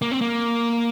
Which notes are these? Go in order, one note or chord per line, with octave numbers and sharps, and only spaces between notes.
A#3
C4
A#3